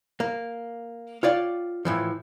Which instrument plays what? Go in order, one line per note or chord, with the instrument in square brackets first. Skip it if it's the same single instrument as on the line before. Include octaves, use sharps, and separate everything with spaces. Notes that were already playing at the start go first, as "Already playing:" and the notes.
[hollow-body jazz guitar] A#3
F4 C#5 D5 F5 G5
A2 E3 F3